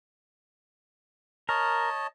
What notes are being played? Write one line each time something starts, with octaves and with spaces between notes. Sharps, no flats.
A#4 C#5 D#5 A5